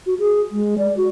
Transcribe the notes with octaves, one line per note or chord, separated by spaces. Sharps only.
F#4
G#4
G#3
D5
F#4